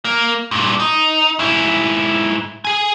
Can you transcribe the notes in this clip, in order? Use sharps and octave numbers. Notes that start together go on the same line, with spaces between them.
A#3
G2 A#2
D#4
G#2 E4
G#4 G#5